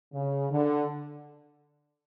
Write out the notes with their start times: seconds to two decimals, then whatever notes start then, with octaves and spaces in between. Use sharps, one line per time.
0.13 C#3
0.50 D3